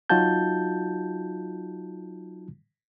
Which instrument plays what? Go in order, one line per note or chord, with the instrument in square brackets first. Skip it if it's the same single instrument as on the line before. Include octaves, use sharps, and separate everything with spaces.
[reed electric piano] F#3 D#4 F4 F#4 A5 G6